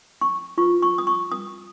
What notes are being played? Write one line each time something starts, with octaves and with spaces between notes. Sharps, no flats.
C#6
F4 B4 C#6
C#6
D#6
C#6
D#6